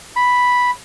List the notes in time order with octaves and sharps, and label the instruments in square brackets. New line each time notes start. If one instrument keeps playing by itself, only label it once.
[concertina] B5